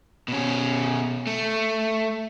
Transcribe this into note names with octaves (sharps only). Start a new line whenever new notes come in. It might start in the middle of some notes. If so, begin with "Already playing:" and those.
B2 C#4
A3